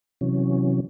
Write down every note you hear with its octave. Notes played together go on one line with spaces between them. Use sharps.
C3 E3 F#3 C#4